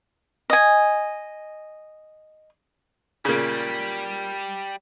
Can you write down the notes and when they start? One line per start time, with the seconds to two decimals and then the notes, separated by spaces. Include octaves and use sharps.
0.50 D#5 G#5
3.25 A#2 C#3 G3